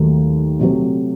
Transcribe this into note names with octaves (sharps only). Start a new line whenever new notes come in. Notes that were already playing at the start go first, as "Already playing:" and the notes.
Already playing: D#2 D#3 F#3 A3 D#4
C3 F#3 A3 C4